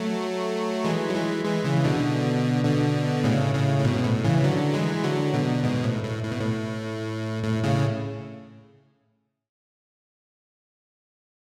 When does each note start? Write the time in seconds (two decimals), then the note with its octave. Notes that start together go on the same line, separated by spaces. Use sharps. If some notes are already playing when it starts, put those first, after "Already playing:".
Already playing: F#3 A3
0.84 E3 G#3
1.10 F#3
1.15 E3 G#3
1.45 E3 G#3
1.64 C#3 E3
1.84 B2 D3
2.64 B2 D3
3.24 A2 C#3
3.55 A2 C#3
3.78 A2
3.84 G#2 B2
4.04 A2
4.25 C#3 E3
4.44 D3 F#3
4.74 E3 G#3
5.04 D3 F#3
5.34 B2 D3
5.64 G#2 B2
5.84 A2
6.04 A2
6.24 A2
6.31 B2
6.41 A2
7.44 A2
7.64 A2 C#3